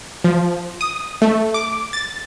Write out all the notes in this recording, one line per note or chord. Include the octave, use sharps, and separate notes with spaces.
F3
D#6
A3
D6
A6